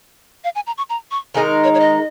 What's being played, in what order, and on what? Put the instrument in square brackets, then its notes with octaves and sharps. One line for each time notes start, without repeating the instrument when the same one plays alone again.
[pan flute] F5
G#5
A#5
C#6
A#5
C#6
[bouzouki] D#3 G#3 D#4 A#4 [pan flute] G#5
[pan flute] C#5
C#5
D#5